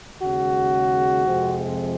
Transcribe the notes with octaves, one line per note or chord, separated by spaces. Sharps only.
D#2 C#3 G#3 F#4
F2 C3 F3 G#3 C4